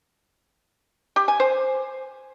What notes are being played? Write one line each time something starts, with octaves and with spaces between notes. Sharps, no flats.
G4
G#5
C5